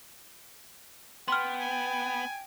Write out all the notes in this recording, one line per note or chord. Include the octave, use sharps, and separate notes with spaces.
B3 G5 C6 F6
G#5